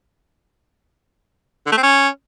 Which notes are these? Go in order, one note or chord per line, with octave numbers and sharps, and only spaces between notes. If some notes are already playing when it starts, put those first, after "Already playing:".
D3
A3
C4
C#4